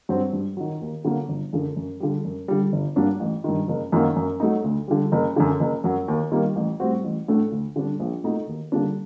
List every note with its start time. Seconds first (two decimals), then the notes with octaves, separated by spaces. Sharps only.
0.09 G2 F#3 C4
0.33 G2
0.57 D#3 F#3
0.81 D#2
1.05 D3 F#3 A#3
1.29 G1
1.53 F#2 D3
1.76 F#2
2.00 D3 G3
2.25 F#2
2.48 D3 G3
2.72 G1
2.96 G2 F#3 A#3 D4
3.20 A1
3.44 G2 D#3
3.68 F#1
3.92 F#2 D#3 F#3 A#3
4.16 F#2
4.40 F#3 A3 D#4
4.64 D2
4.88 D3 G3
5.12 F#1
5.36 F#2 D3
5.60 F#1
5.84 F#2 F#3
6.08 D#2
6.32 D#3 G3 A#3
6.56 A1
6.80 A2 G3 C4 F#4
7.04 A1
7.28 A2 A3 D4 F#4
7.51 D2
7.76 D3 G3 D4
8.00 A#1
8.24 A#2 A3 D#4 F#4
8.47 D#2
8.72 D3 G3 A#3 D4